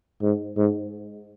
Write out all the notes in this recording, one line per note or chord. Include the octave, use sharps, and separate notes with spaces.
G#2
G#2